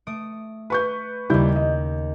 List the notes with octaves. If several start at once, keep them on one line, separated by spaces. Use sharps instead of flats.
A3 D#6 D7
B4 C#6 G6
D#2 C#3 G3 E4 G6
D#5